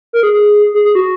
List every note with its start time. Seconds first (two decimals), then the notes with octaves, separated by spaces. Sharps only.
0.13 A#4
0.23 G#4
0.33 G#4
0.74 G#4
0.85 G#4
0.95 F#4